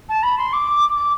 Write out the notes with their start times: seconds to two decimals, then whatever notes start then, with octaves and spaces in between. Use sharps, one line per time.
0.09 A5
0.23 B5
0.38 C6
0.53 D6
0.96 D6